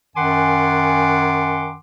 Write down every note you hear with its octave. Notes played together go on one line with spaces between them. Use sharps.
F#2 D#3 F#5 G#5 C6 D6